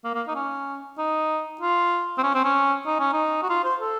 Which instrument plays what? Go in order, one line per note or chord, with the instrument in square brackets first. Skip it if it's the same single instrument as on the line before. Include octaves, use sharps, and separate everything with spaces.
[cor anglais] A#3
A#3
D#4
C#4
D#4
F4
C4
C#4
C4
C#4
D#4
C#4
D#4
F#4
F4
C5
A4